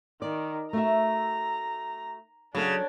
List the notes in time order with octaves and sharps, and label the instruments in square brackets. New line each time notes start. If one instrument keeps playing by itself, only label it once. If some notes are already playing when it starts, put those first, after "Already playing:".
[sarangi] D#3 [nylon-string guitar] D5
[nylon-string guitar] A3 F#4 E5 [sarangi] A#5
[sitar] C#3 [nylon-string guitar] F#3 A4 F#5 [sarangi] D4